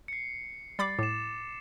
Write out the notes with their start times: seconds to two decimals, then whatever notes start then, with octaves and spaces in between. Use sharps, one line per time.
0.08 C7 C#7
0.79 G3 B5 D6 A6 C7
0.99 A2 D6 E7